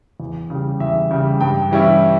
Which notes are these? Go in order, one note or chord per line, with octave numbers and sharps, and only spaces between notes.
E2
C#3 G3
E2 E5
C#3 G3
G2 G5
E3 G3 C#4 E4